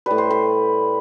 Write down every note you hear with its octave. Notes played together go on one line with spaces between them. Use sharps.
A2 G3 B4
C5
B4